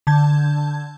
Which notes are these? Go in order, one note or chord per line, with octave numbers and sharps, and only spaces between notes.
D3 A5 G6 G#6